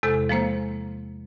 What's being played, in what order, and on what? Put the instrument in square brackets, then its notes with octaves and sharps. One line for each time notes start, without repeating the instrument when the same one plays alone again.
[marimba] E2 C3 G#3 A4
F3 G#3 A#3 C5